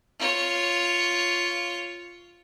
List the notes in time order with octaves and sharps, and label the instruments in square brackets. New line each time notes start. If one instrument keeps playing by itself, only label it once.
[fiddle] F4 C#5